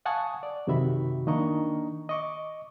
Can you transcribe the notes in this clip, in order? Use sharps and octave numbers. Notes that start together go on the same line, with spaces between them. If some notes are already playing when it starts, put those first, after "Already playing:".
F5 F#5 G#5 A5 C#6 D#6
D5
F#2 C3 D#3 F#4 E5 B5
D#3 A#3 D4 D#5 A#5 C#6
D#5 C#6 D6